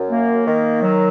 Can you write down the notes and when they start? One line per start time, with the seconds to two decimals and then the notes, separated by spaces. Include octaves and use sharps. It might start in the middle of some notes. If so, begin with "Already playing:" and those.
Already playing: F#2
0.09 A#3
0.47 D#3
0.82 F#3